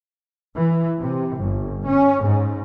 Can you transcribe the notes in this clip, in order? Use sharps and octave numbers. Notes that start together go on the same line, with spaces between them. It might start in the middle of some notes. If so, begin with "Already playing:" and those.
E3
C3
G1
C#4
G#2